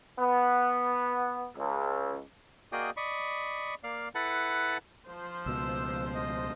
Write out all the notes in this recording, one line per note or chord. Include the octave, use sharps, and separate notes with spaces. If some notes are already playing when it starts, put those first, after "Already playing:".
B3
C#2
A#3 F#4 G#4 D5 D#5 G5
D5 D#5 B5 C#6
A#3 D5 F5
E4 A4 B4 F#5 A5 F#6
F3 C5
C#2 B2 E6
D#5